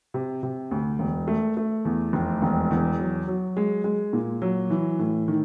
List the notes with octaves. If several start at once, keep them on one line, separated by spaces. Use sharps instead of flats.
C3
C3
D2
E1
A3
A3
E2
F1
E1
E2
F#3
F#3
G#3
G#3
A#2
F#3
E3
A2
D#3